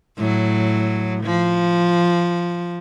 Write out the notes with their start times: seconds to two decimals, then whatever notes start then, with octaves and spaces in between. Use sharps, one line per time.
0.17 A2 F#3
1.24 F3